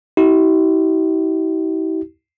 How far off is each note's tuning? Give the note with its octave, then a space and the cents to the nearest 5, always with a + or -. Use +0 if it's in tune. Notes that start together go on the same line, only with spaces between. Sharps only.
E4 -45 G4 -40